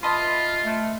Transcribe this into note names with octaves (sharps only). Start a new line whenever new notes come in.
F4 B4 D#5 E5 A5 C6
A3